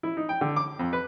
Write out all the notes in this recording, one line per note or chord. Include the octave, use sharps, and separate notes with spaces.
E4
D#4
G5
D3
D6
F2
B4